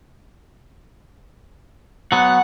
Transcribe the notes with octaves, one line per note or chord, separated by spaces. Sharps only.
F#3 B3 F#5